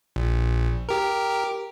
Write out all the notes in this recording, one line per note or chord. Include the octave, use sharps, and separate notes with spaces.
A#1
G4 A#4